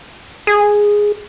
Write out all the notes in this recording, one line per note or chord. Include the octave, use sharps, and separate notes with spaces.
G#4